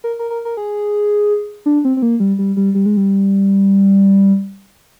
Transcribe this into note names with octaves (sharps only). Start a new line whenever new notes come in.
A#4
A#4
A#4
A#4
G#4
D4
C4
C4
A#3
G3
G3
G3
G3
G#3
G3